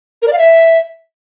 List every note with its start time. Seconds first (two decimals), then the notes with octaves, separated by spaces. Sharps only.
0.22 A#4
0.28 D5
0.33 F5
0.38 E5